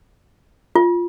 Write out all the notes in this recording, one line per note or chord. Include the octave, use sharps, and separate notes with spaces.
F4